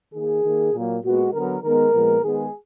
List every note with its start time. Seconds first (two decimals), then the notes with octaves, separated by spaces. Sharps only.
0.13 D#3 A#3 G#4
0.44 D#3 A#3
0.74 A#2 F#3 A#3
1.04 A#2 G#3 B3 F#4
1.33 D3 F#3 B3 A#4
1.63 D#3 G#3 B3 A#4
1.93 A#2 F3 G#3 B3
2.23 D#3 G#3 B3 G#4